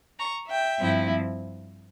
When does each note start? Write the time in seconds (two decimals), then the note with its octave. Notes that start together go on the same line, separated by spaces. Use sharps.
0.19 A#5 C#6
0.49 E5 G5
0.80 G2 F3 C4 E4